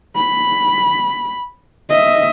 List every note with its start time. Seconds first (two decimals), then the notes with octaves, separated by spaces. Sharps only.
0.16 B5
1.89 D#5 E5